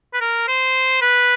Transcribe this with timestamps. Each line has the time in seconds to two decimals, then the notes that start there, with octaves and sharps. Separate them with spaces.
0.13 B4
0.21 A#4
0.48 C5
1.01 B4